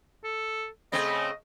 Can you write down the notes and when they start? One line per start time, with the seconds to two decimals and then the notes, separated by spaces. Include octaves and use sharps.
0.24 A4
0.92 C#3 A3 C4 D#5